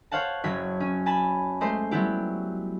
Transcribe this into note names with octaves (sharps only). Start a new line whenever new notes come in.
C5 C#5 F5 F#5 A5
F#1 F#3 C#5 B6
C#4
G#5 A5 B5
G#3 A3 C5 C6
F#3 G3 B3 E4 G4